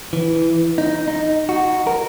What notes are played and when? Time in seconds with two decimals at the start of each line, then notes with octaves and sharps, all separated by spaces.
0.13 E3
0.78 D#4
1.08 D#4
1.49 F#4
1.87 A#4